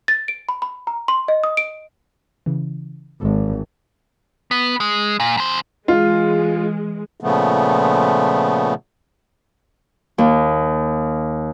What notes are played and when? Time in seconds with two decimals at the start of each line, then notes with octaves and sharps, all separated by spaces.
0.08 A6
0.28 D7
0.49 B5
0.62 B5
0.87 A#5
1.08 C6
1.28 D#5
1.44 D#6
1.57 D7
2.46 C#3 E3
3.21 G#1 G#3 A4
4.51 B3
4.80 G#3
5.20 A#2
5.37 E2 C5
5.88 E3 G#3 F4
7.20 A#2 C#3 F3 A3 B3
10.18 D#2